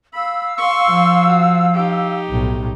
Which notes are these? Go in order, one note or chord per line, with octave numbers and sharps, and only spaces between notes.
F5 B5 E6
C6 C#6
F3
F#4
D#4 G4
B1 A2